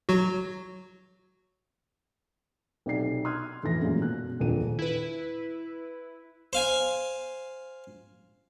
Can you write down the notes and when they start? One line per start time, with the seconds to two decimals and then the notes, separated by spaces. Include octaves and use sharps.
0.09 F#3 F#4
2.86 B1 C3 D5 G5 C7
3.25 C6 D#6 F6 F#6 G#6
3.63 F2 A2 E3 A#6
3.82 F#2 A#2 G#3
4.01 B2 F#6
4.40 D#1 A#1 F2 D#7
4.79 E4 B4
6.53 C5 F5 G#5